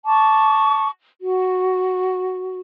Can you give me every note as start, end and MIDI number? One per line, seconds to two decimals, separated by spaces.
0.06 0.89 81
0.06 0.89 85
0.06 0.89 86
1.21 2.61 66